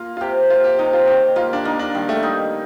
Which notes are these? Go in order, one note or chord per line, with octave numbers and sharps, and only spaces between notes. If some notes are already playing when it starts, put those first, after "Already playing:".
Already playing: A#3 F4
F4
C3 G4
A#3 F4
G4
C3 D#4
F4
D#3 G4
A#3 F4
D4
A#3 D#4
D4
D#3 G3
A3
G3 D#4